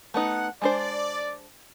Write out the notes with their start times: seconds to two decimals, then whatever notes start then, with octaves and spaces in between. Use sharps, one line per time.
0.14 A3 B3 D#4 F#5
0.62 G#3 D4 C5 D5